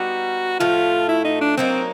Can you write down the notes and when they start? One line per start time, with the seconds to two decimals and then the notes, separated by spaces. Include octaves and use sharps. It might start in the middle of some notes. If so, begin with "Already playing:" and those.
Already playing: G3 B3 D#4 F#4
0.60 A2 F3 A3 F4
1.09 E4
1.25 D#4
1.41 D4
1.57 F#3 A#3 C4 D#4